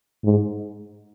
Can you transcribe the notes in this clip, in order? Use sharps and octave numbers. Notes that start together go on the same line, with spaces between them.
G#2